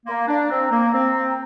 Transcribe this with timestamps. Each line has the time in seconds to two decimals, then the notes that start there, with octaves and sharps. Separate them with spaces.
0.06 A#3 C6
0.10 A#5
0.28 D4
0.49 C4
0.71 A#3
0.92 C4